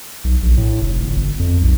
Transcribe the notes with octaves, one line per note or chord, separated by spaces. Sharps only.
B1
A#1
A2
F1
G1
G1
F2
B1